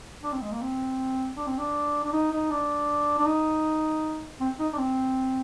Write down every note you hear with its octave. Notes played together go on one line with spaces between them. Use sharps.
D4
C4
G#3
A#3
C4
D4
C4
D4
D4
D#4
D#4
D4
D4
D#4
C4
D#4
D4
C4